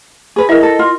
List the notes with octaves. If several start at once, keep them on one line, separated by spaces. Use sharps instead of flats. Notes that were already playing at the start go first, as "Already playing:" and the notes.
G#4 B4
D#4 E4 G#4 A#4 D#5 E5
A4
F4